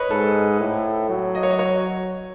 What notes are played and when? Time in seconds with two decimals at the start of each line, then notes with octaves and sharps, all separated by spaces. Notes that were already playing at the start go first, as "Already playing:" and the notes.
Already playing: B4 C#5 D#5
0.10 G#2 A4
0.60 A2
1.09 F#3
1.35 D#5
1.43 C#5
1.51 D#5
1.59 C#5